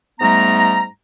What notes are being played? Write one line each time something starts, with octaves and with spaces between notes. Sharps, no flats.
G#2 G3 A3 B3 A#5